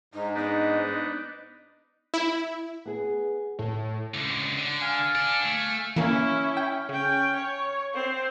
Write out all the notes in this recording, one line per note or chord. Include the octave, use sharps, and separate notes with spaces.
G#2 D#4
B3 D4 D#4 D#5
E4
B3 G#4
A2 A4
C#2 D3
D3
F5 G#5
A4 D5
A3
E3 A#3 C#4 E4
G5
C#3 C#4 G5
C#5
C4 C5